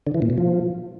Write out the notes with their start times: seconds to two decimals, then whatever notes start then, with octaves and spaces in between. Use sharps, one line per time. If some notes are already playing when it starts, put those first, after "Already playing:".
0.07 D3
0.14 E3
0.22 A#2
0.30 B2
0.38 F3